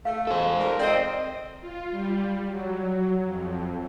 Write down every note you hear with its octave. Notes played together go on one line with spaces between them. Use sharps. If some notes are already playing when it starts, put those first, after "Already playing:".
A3 F5
G#3 A4 C5
G#2 G3 A#4
C4 D5 D#5
F4
G3
F#3
F2